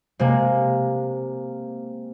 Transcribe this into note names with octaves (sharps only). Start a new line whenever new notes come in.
C3 G#3 A#3